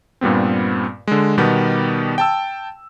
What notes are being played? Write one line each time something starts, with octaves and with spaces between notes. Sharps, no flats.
G2 A#2 G3 B3 C4
D3 G#3
B2 D#3 G3 B3 G4
G5 A5 E6